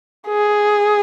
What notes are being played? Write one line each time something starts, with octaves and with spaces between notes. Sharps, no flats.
G#4